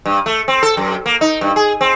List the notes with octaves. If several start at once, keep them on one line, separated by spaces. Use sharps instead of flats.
G2
A3
C4
A4
F#2
A#3
D#4
G2
G#4
C4